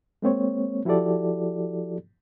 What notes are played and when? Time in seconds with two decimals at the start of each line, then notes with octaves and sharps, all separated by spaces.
0.22 G#3 A#3 C4 C#5
0.85 F3 E4 F#4 G4 A4 D5